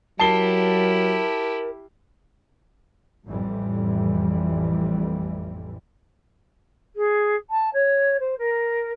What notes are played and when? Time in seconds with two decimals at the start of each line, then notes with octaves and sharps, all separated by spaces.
0.19 F#3 E4 G4 A#4 A5 C7 G7
3.27 A1 F2 A2 E3 G3
6.95 G#4
7.50 A5
7.73 C#5
8.19 C5
8.38 A#4